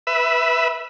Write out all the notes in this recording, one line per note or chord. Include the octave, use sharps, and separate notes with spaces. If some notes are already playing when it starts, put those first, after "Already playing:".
B4 E5